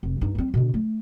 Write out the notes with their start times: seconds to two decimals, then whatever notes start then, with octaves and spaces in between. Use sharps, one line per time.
0.03 F1
0.21 G2 D#4
0.35 G3 C4
0.54 B2 D3
0.74 A3